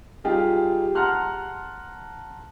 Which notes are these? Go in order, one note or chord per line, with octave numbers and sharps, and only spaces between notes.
G3 D#4 F4 G4 G#4
F#5 A5 A#5 C6 F6 F#6